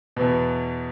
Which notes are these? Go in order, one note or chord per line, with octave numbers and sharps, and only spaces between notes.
E2 B2